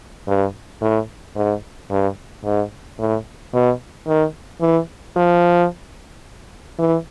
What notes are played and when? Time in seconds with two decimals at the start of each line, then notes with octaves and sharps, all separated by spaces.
0.28 G2
0.81 A2
1.36 G#2
1.91 G2
2.44 G#2
2.99 A2
3.54 B2
4.07 D#3
4.61 E3
5.16 F3
6.79 E3